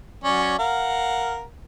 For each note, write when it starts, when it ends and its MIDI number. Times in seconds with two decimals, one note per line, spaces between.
0.24 0.54 54
0.24 0.54 61
0.24 0.54 74
0.59 1.42 70
0.59 1.42 77
0.59 1.42 78